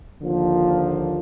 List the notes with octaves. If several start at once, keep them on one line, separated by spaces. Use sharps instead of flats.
D#2 D3 F3 A#3